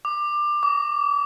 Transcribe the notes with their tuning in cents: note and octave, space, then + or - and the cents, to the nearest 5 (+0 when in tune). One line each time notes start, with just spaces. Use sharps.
D6 +20
D6 -40